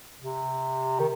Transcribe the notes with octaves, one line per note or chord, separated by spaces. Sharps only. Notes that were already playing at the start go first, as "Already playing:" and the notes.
C3
D#3